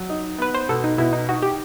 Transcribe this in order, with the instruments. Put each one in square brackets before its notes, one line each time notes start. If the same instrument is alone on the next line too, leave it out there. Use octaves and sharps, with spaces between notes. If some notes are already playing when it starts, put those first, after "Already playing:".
Already playing: [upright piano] F#3
D#4
[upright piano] B3 [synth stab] B4
[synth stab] C5
[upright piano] B2 [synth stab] A4
[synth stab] D#4
[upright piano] B2 [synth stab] E4
[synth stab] D#4
[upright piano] D#4 [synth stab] F#4
[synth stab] G4